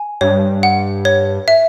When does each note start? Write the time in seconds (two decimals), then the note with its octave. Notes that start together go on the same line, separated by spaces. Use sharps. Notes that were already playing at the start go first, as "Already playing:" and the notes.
Already playing: G#5
0.21 G2 C#5
0.63 F#5
1.05 C#5
1.48 E5